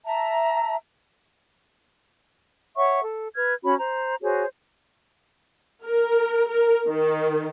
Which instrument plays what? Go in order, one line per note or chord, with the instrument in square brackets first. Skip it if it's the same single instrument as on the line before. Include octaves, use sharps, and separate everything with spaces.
[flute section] E5 A5 A#5
C#5 E5 F#5 C#6
A4
B4 F6 G#6
C#4 F#4 C#5 B5
C5 A#5
F#4 G#4 C5 C#5
[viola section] A#4
A#4
D#3